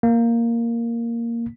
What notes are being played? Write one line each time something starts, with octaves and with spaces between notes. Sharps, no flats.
A#3